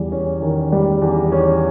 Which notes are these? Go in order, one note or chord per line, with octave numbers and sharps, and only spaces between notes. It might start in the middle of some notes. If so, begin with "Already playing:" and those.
Already playing: E2 G3
C#4
D#3
G3
E2
C#4